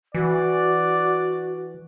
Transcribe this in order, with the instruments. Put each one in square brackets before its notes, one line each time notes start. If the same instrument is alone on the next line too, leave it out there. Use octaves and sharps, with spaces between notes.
[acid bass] E3 [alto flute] F#4 [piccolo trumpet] D5